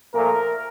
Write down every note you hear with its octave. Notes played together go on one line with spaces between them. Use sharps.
A#2 F3 A3 A#4